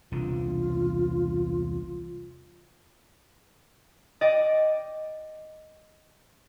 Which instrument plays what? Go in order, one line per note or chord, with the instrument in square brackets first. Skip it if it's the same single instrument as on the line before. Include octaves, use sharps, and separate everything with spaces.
[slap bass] E1 C2 D3 [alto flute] F4
[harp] D5 D#5 G5 D6